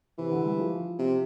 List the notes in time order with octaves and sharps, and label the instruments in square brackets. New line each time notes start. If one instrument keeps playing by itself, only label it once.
[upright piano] C3 [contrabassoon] E3
[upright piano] D3
G3
F3
[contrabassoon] C3